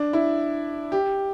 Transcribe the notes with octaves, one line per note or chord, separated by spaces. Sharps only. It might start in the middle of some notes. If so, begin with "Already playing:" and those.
Already playing: D4
E4
G4